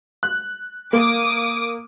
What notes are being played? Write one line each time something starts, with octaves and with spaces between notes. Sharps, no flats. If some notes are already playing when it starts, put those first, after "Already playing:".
F#6
A#3 D6 D#6